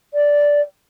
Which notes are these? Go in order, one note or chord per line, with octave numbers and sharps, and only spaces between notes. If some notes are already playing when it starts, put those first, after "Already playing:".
D5